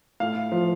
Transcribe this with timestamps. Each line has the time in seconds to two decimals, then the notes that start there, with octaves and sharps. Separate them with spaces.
0.20 A2 F5
0.52 F3